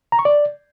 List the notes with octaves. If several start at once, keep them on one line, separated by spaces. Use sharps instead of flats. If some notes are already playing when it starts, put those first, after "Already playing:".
A#5
C#6
D5